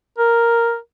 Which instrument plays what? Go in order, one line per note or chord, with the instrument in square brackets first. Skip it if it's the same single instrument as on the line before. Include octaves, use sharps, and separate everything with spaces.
[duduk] A#4